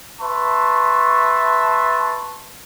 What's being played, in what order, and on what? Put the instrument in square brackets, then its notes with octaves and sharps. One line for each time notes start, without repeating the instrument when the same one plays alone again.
[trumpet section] B4 E5 A5 C6 C#6